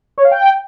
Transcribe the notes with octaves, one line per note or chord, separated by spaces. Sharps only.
C#5
F5
G5